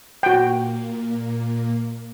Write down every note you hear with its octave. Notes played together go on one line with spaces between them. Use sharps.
A#2 A#3 F#4 G5